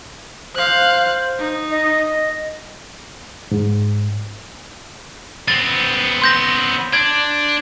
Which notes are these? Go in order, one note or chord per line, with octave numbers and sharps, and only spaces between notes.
C5 F5 F#6
D#4
D#5
G#2
B3 C4 A6
C6 G6 A#6
D4 G#6